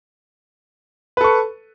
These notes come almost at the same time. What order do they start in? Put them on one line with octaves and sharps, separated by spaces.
B4 A4 C#6